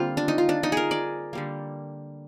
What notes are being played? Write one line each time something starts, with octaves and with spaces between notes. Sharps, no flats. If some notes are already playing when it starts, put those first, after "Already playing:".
Already playing: D3 G3 A#3 C4 F4
D4
D#4
F4
D4
D#4
G#4 A#4
D5
D3 G3 A#3